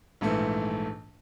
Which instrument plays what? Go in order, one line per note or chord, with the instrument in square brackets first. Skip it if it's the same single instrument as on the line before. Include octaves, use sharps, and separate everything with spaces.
[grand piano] A#1 G#2 E3 A3